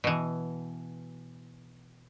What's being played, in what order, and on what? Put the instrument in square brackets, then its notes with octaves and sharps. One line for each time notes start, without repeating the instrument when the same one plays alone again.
[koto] B2 E3